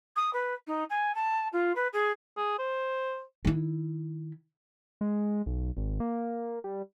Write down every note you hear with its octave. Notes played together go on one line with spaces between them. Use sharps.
D#6
B4
D#4
G#5
A5
F4
B4
G#4
G#4
C5
D#3 E4
G#3
B1
G#1
A#3
G3